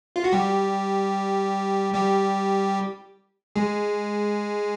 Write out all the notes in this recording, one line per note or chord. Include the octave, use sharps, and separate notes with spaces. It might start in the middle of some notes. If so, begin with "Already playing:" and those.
F4
F#4
G3 G4
G3 G4
G#3 G#4